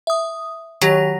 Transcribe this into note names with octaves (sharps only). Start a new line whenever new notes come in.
E5 D#6
D#3 F#3 G4 A#6